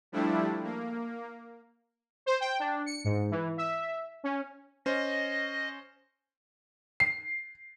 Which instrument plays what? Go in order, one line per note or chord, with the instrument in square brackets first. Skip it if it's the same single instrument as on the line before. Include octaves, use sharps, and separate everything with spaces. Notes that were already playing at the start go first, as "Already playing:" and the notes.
[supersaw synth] F3 G3 A3 D4 E4
A#3
[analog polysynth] C5
G5
D4
C#7
G#2
E3
E5
C#4
[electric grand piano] C#4 C5 [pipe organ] D#5
[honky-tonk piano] C7